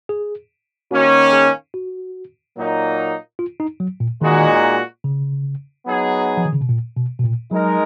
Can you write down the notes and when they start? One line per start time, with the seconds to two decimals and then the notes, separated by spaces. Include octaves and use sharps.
0.09 G#4
0.91 D#3 A#3 C#4 F#4
1.32 G#4
1.74 F#4
2.56 A#2 F#3 A#3 D#4
3.39 F4
3.60 D#4
3.80 F#3
4.00 A#2
4.21 A#2 D#3 G#3 D#4 F#4
5.04 C#3
5.87 F#3 B3 D#4 G#4
6.37 F3
6.45 D#3
6.53 C#3
6.61 B2
6.69 A#2
6.97 B2
7.19 B2
7.24 A#2
7.51 F#3 G#3 D#4 A#4